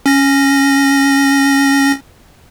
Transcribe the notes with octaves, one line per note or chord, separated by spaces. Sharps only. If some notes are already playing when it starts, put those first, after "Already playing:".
C#4 A#6